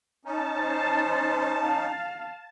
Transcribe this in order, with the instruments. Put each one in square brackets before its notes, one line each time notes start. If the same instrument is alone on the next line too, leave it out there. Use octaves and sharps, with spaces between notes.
[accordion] C#4 D#4 [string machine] A5
[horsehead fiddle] C5
F5